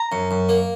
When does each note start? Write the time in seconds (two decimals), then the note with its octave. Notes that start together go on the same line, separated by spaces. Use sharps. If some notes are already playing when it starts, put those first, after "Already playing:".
Already playing: A#5
0.12 F#2
0.31 F#2
0.49 A#3